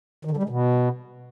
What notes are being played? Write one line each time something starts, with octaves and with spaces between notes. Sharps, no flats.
D#3
D3
G3
G#3
B2